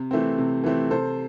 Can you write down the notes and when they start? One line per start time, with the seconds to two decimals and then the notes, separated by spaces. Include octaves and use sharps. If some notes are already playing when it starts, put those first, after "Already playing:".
Already playing: C3
0.11 E3 A3 C4
0.38 C3
0.64 E3 A3 C4
0.91 C3 A4 C5